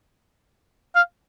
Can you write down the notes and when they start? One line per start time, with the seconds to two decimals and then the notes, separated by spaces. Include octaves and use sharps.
0.95 F5